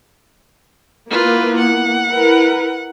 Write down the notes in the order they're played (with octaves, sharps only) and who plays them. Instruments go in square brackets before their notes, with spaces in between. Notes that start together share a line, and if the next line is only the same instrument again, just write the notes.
[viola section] A#3 B3 E4 [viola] F4 B4
[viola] F#5
[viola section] E4 A#4 B4